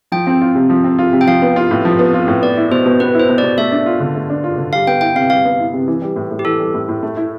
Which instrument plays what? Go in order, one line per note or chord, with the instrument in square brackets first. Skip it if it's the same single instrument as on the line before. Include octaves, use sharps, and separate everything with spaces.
[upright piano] F3 [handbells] G5
[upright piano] C4
F4
C3
F3
C4
F4
C3
[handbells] G5
[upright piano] F3 [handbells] F5
[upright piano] B3
F4
A2
F3
B3
F4
A2
[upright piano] B3 [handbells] D5
[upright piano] E4
[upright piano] B2 [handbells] C5
[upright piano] B2
[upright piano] B3 [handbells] B4
[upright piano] E4
[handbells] C5
[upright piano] B2
[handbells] D5
[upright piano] B2
[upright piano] A3 [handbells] E5
[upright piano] D4
F4
D3
A3
D4
F4
D3
[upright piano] G3 [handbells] F5
[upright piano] B3 [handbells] G5
[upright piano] E4 [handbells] G5
[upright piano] C3 [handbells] F5
[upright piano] G3 [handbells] F5
[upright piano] B3
E4
C3
E3
G3
A2
A2
[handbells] G4
[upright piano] E3 [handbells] A4
[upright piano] G3
A2
A2
A3
E4